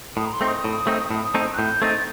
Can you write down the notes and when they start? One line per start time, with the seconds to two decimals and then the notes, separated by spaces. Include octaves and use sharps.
0.17 A2 D#6
0.26 A#5
0.33 C6
0.41 A3 C4 D#4
0.48 D#6
0.64 A2
0.87 A3 C4 D#4
1.11 A2
1.35 A3 C4 D#4
1.53 F#6
1.58 A2 G6
1.82 A3 C4 D#4 A6